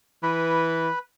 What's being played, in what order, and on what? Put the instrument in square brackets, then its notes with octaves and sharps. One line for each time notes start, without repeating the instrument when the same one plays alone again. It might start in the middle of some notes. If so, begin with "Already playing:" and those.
[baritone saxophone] E3 [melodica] B4 B5